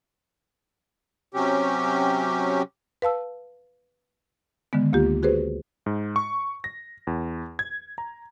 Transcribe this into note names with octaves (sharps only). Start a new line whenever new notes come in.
C3 F#3 C#4 G4
B4 F5 A5 E6
D3 D#3 G#3 B3
D2 A#3 F4 G4
F#4 G#4 B4 C5
G#2
C#6
A#6
E2
G#6
A#5